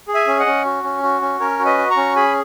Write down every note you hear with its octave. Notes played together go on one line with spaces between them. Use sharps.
G#4
E5 G#5
C#4
D#5 F#5
C#4
F#4
C#4
F#4
C#4
C#4 A#4 C#5
F#4
B4 D#5
F#4
A#5 C#6
C#4
G#4 G#5 B5